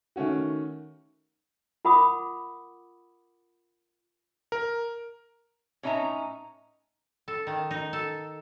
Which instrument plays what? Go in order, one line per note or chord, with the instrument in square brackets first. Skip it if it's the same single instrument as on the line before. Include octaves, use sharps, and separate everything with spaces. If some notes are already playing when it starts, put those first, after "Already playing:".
[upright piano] D#3 A3 C#4 F#4
[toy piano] F4 A#4 F#5 B5 D6 D#6
[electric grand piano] A#4
[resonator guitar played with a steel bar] A2 C#4 D#4 E4 E5 A#5
[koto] A4
D#3
D#4
A4